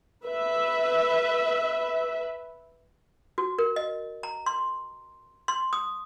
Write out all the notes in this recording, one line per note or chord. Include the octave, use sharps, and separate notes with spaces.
B4 E5
F#4
A#4
D#5
A#5
C6
C6
D#6